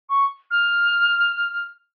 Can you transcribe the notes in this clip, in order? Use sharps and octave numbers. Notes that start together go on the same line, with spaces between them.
C#6
F6